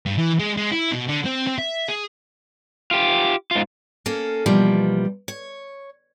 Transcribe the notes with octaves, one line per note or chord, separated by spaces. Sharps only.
G2
E3
G#3
G#3
E4
B2
D3
C4
C4
E5
G#4
F4 G4
G#2 F4
A#3 C#4 A4
B2 E3 F3 G3 A#3
C#5